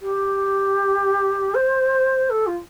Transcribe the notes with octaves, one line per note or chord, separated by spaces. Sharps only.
G4
C5
A4
F4